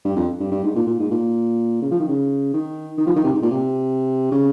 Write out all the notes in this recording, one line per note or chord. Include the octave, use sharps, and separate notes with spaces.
G2
F2
G2
G2
G#2
A#2
A#2
G#2
A#2
C#3
F3
D#3
C#3
D#3
D#3
F3
D#3
C3
G#2
A#2
C3
C#3